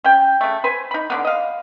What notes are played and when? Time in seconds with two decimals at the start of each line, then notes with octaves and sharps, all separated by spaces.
0.04 C#4 G5
0.41 C#3 A3
0.64 B4 C5 G#5
0.91 D#4 B5
1.10 D3 A#3 B3
1.25 D#5 F5